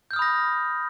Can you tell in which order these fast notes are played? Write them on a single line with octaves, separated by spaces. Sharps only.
G6 F6 D#6 B5 A#6